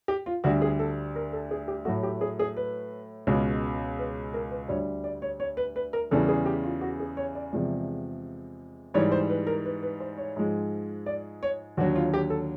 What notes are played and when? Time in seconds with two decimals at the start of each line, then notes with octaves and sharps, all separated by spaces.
0.08 G4
0.26 F4
0.44 D2 D3 G3 F#4
0.62 G#4
0.79 A4
1.15 A#4
1.33 A4
1.51 G#4
1.68 G4
1.85 A2 F#3 A3 F#4
2.03 G4
2.21 G#4
2.39 G#4
2.57 B4
3.27 C#2 B2 G#3
3.99 B4
4.34 A#4
4.51 B4
4.68 D2 D3 G3 C#5
5.04 D5
5.22 C#5
5.40 C#5
5.57 B4
5.76 B4
5.93 A#4
6.11 E2 C#3 E3 G3 A4
6.29 G#4
6.46 G4
6.63 F4
6.81 F#4
7.00 G#4
7.17 C#5
7.35 D5
7.52 E2 C3 F3 G#3 D5
8.94 G#2 E3 G3 C#5
9.12 C5
9.29 B4
9.47 A#4
9.65 B4
9.83 B4
10.00 C5
10.18 C#5
10.36 G#2 F3 G#3
11.06 D5
11.43 C#5
11.77 D#2 D3 F#3 F#4
11.95 F4
12.13 G4
12.30 A4